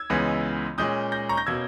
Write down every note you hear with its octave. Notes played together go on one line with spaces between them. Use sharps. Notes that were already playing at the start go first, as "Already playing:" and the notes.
Already playing: E6 G#6
C#2 C#3 E3 G#3 B3
A#2 G#3 C#4 D#6 G6
G6 A#6
A#5 C#6
G6 A#6
B2 A#3 C#4 E6 G#6